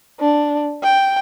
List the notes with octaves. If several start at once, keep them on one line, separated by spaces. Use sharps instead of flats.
D4
G5